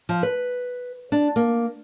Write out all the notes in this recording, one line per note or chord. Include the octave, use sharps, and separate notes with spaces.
F3
B4
D4
A#3